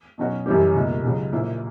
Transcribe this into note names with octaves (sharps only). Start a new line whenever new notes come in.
B2 F#3 C#4 F#4
F#2 E3 G3 C#4 G4
C#2 B2 A#3
C#2 C#3 F#3
A#1 A#2 A#3 E4